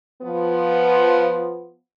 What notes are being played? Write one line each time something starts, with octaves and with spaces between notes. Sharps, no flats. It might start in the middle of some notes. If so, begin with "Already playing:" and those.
F3 B3